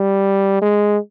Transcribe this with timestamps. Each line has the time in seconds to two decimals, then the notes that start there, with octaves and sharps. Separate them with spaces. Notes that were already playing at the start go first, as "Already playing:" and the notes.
Already playing: G3
0.62 G#3